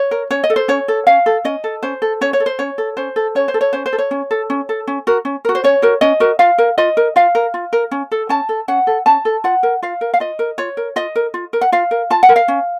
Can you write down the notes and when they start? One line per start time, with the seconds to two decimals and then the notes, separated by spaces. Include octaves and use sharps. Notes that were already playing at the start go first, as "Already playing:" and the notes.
Already playing: C#5
0.11 A#4
0.31 C#4 C#5
0.44 D#5
0.50 A4
0.56 C5
0.68 C#4 C#5
0.88 A4
1.07 C#4 F5
1.26 A4
1.45 C#4 D#5
1.64 A4
1.83 C#4 C5
2.02 A4
2.21 C#4 C#5
2.33 C#5
2.40 A4
2.46 C5
2.59 C#4 C#5
2.78 A4
2.97 C#4 C5
3.16 A4
3.35 C#4 C#5
3.48 C5
3.54 A4
3.61 C#5
3.73 C#4 C5
3.86 C5
3.93 A4
3.98 C#5
4.11 C#4
4.31 A4
4.50 C#4
4.69 A4
4.87 C#4
5.07 F#4 A#4
5.25 C#4
5.45 F#4 A#4
5.55 C5
5.64 C#4 C#5
5.82 F#4 A#4
6.01 C#4 D#5
6.20 F#4 A#4
6.39 F4 F5
6.58 A#4
6.78 F4 D#5
6.97 A#4
7.16 F4 F5
7.35 A#4
7.54 F4
7.73 A#4
7.91 C#4
8.11 A4
8.29 C#4 A5
8.49 A4
8.68 C#4 F#5
8.87 A4
9.06 C#4 A5
9.25 A4
9.44 F4 F#5
9.63 A#4
9.83 F4 F5
10.01 A#4
10.14 F5
10.20 F4 D#5
10.39 A#4
10.58 F4 C#5
10.77 A#4
10.96 F4 D#5
11.16 A#4
11.34 F4
11.53 A#4
11.61 F#5
11.72 F4 F5
11.91 A#4
12.10 F4 A5
12.23 F#5
12.29 A#4
12.36 F5
12.48 C#4